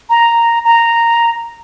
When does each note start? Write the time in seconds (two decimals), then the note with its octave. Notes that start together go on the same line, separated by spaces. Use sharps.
0.10 A#5
0.64 A#5